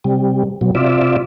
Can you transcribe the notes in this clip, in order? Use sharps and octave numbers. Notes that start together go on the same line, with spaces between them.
C3 G3
B2 F#3
C3 F4 D5 E5